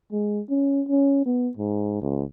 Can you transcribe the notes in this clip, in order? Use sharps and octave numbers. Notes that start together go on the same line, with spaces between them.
G#3
C#4
C#4
B3
G#2
C#2